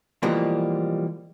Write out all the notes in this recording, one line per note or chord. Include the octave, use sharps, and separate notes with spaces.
B2 E3 F3 G3 G#3 A#3